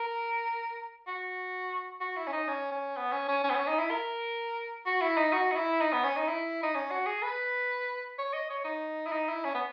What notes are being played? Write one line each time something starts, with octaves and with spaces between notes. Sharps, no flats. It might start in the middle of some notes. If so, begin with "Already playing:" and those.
Already playing: A#4
F#4
F#4
E4
C#4
D#4
C#4
C#4
B3
C#4
C#4
C#4
B3
C#4
D#4
E4
A#4
F#4
E4
D#4
F#4
D#4
E4
D#4
B3
C#4
D#4
E4
D#4
C#4
F#4
G#4
B4
C#5
D#5
C#5
D#4
E4
D#4
E4
C#4
B3